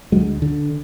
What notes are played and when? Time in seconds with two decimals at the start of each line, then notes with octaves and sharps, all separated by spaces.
0.12 D2 D3 F#3 G#3
0.42 D3